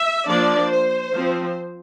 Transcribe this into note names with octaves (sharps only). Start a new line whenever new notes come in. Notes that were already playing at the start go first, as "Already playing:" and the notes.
Already playing: E5
F3 A#3 D4 D5
C5
F3 C4